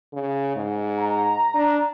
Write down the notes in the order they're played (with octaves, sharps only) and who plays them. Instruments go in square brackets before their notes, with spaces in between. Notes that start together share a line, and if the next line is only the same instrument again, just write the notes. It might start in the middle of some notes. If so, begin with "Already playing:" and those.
[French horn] C#3
G#2
[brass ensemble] A#5
[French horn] D4